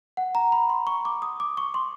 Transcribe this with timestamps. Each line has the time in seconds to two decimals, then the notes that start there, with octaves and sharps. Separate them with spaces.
0.17 F#5
0.35 A#5
0.52 B5
0.69 C6
0.87 C#6
1.05 D6
1.22 D#6
1.40 D6
1.57 C#6
1.74 C6